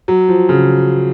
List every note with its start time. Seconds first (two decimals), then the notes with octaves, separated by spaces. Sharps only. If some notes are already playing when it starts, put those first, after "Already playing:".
0.08 F#3
0.29 F3
0.49 C#3